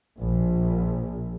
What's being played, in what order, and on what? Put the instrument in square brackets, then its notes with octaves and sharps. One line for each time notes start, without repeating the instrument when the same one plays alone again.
[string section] A#1